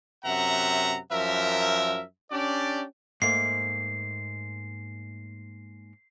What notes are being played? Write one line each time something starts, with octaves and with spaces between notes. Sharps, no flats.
F#2 C3 E5 F#5 A#5
F#2 F3 A#4 E5
C#4 D4 G4 D5
G#2 A3 A#3 C7